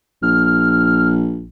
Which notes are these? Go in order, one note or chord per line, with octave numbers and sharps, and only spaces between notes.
A#1 F6